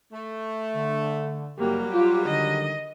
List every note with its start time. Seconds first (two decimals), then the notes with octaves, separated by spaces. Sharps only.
0.13 A3
0.76 D3
1.59 F#1 F#3 G3 A#3 G4
1.93 F4 G4
2.26 D3 D#3 D#5